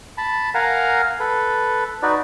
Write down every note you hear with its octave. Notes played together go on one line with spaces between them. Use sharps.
A5 B5
A#4 F5 F#5 G#5 A#5
A4 B4
D#4 F#4 B4 D5